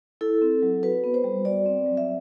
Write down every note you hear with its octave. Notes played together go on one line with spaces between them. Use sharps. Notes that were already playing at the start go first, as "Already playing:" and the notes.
E4 A4
C4
F#3
F#4 B4
B3
C5
G3
F#4 D5
C4
F#3
E5